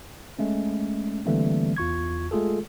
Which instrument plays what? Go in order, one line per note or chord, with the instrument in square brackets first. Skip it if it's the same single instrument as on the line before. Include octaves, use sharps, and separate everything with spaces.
[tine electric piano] G#3 A3 C#4
D3 E3 G3 A3 A#3 C4
E2 F4 C#6 G#6
G#3 A3 F4 G#4 A4